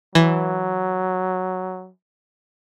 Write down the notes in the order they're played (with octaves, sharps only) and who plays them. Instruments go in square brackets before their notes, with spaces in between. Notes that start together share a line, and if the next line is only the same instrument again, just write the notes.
[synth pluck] E3 [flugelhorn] F#3